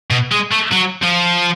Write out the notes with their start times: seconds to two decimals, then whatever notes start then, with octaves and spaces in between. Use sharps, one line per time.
0.11 B2
0.32 G#3
0.51 A3
0.71 F#3
1.02 F3